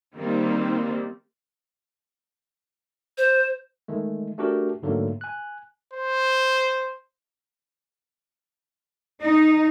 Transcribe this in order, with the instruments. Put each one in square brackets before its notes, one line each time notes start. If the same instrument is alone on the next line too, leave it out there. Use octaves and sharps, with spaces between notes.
[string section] D#3 G3 A#3 C4
[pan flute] C5
[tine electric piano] D#3 G#3 A3
A3 D4 F#4 G4 A#4
G#2 D3 F#3 A3 A#3
G#5 F#6
[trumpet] C5
[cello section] D#4